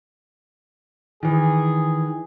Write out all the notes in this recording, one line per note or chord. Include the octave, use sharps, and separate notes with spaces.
D#3 E3 G#4